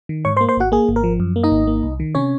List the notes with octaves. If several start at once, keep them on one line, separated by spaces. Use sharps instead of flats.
D#3
G#2 C#5 C#6
C5 C6
A#3
C5 C6
G#1 F#4 F#5
A#3 G#4
G#1
A#4
F3
F#2
A#3
D#4 D#5
G#1
A#3
C2
D#3
C3 C#4 C#5